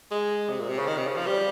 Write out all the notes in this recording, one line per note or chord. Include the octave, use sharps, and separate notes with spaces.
G#3
C3
A#2
C3
C#3
D#3
C3
C#3
F3
G3